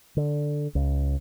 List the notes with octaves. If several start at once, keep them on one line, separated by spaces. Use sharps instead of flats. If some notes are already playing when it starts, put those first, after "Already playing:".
D3
C#2